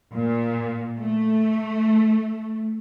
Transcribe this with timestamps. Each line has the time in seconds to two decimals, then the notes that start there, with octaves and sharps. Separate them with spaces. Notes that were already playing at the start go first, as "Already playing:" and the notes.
0.14 A#2
0.99 A3